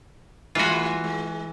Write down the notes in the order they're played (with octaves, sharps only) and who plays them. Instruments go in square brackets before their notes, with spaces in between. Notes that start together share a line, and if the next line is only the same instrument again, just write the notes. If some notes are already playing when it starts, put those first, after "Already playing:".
[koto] E3 G#5 [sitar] G3 A3 B4 [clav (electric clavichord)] F4 F#4
[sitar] G#3